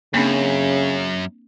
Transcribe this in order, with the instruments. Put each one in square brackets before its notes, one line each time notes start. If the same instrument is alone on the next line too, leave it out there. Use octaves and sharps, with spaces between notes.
[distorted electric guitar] F#2 [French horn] C#3 [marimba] A#3 C4 D4